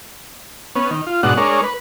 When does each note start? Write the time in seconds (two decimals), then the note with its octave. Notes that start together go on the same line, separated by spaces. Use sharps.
0.75 B3 C#4
0.91 D#3
1.07 F4
1.23 G#2 B2 D4 F#4 F#5
1.37 G#3 D4 A#4 C#5
1.64 B4